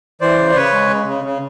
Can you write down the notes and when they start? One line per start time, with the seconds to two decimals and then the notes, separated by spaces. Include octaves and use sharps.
0.21 E3 C5 D5
0.39 C#3
0.51 D5
0.56 C#3 B4 C#5
0.73 G#3
0.90 C#3
1.07 C#3
1.24 C#3